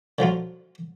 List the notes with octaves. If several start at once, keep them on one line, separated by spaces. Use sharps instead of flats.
D3 F3 F#3 F4